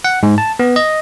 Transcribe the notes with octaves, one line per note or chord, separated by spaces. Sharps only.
F#5
G#2
A5
B3
D#5